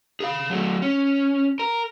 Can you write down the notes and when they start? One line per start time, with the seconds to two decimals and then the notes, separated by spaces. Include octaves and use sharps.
0.20 G#4 F5
0.50 F#3 A3
0.82 C#4
1.59 A#4